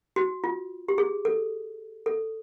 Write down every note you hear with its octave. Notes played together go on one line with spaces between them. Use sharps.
F#4
F4
G4
G#4
A4
A4